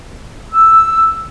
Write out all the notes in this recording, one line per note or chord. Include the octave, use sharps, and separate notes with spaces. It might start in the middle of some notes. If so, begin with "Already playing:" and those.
E6